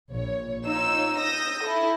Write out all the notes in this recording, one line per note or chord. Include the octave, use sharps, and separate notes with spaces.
A#1 C#5
D#4 F4 C#5 E6
D#6 E6 G6 A#6
E4 A4